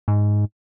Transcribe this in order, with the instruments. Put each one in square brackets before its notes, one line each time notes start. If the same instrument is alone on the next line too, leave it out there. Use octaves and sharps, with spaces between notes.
[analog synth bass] G#2